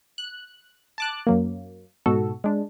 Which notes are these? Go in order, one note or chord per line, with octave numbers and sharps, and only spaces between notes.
F#6
A5 D6 F#6
F#2 F#3 A#3
G#2 B2 F#4 A4
G#3 D4